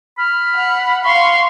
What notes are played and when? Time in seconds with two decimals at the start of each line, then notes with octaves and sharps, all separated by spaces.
0.18 B5 F6
0.55 F#5
1.05 F5 C6 C#6